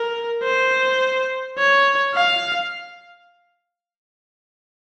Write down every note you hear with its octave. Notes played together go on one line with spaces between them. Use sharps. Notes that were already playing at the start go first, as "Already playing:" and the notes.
Already playing: A#4
C5
C#5
F5